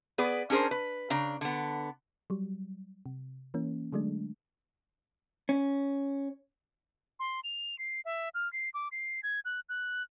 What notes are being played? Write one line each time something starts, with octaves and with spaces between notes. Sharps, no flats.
B3 G#4 B4 D5
C#4 D4 G#4 A#4 C5
B4
C#3 D4 A#5
D3 B3
F#3 G3
C3
E3 A#3 C#4
D3 F#3 G#3 A3 D4
C#4
C6
F7
C7
E5
F6
C7
D6
C7
G#6
F#6
F#6